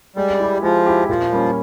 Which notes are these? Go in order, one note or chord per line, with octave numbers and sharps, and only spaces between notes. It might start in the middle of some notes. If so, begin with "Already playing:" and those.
G3 G#3
E4 G4
F3 G#3
E4 G4
A#2 F3
G3 A#3 C#4